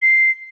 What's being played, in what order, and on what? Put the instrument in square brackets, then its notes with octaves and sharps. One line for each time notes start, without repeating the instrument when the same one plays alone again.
[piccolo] C7